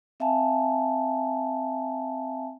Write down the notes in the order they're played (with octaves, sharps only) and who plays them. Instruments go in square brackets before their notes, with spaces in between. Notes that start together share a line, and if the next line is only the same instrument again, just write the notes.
[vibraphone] C4 E5 F5 G#5 A5